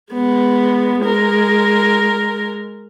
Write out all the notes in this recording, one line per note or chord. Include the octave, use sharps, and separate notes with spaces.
G#3 B3
G#3 A#4